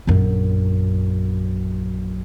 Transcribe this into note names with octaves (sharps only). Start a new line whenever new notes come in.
A#1 F#2